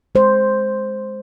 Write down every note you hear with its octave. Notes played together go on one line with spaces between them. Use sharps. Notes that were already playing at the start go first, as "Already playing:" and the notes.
G#3 C5